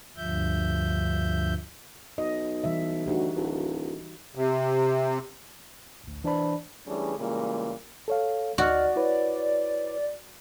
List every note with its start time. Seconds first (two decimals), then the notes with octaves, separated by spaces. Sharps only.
0.17 D2 G2 F3 E5 G6
2.18 B1 D#5
2.64 E3 G3 E5
3.06 D2 D#4 F#4 G4
3.35 D1
4.35 C3
6.04 A1 D2
6.24 E3 D4 C5 D5 A5 B5
6.87 E3 G3 A3 C#4 D4 G#4
7.18 A#2 C#3 E3 G3 G#3 A#3
8.08 A4 C#5 F5
8.58 D2 F#4 D5 D#5 F6
8.96 E4 B4 C#5